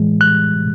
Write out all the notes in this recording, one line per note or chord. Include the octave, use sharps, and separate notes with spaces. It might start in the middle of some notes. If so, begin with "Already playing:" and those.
Already playing: A2 E3 G#3
F#6